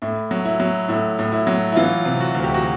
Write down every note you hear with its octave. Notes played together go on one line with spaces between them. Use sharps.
A2 E4
F#3
E4
F#3
A2 E4
A2
E4
F#3
E4
E3 F4
C3
F#4
D2
G4
F#4